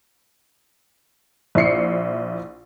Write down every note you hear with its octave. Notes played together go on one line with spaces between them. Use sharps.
A#1 E4 C7 C#7